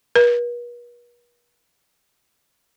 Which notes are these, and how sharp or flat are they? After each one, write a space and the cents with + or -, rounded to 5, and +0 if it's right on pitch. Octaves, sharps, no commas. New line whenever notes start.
B4 -45